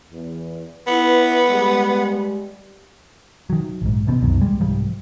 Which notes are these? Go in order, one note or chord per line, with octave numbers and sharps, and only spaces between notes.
E2
B3 E4 B4
G3 G#3
D#3 F#3
A#1 G#2
D#1 B2 B3 C4
C2 F#2 B2 D#3
D1 G3 G#3
C2 G#2 F3 G3